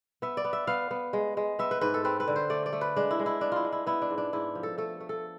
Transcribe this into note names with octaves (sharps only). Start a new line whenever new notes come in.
B3 E5
D5
B3
E5
B3 F5
B3
G#3
G#3
B3 E5
B4
G#2 B4
A4
C4 B4
B4
D3
C5
A3 D5
D5
A3
B4
G#3 D4
E4
G#3
E4
B3 D4
E4 F4
G#3
E4
B3 E4
D4
G#2
D4
G#2 E4
F3
A4
A3 A4
A3
A4